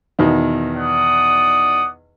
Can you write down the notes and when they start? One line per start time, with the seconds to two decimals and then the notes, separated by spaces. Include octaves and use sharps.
0.19 E2 B2 D#3
0.77 D5 F#5 D#6